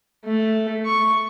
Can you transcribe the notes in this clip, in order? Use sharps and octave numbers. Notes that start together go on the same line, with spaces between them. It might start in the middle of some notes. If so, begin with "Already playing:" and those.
A3
C#6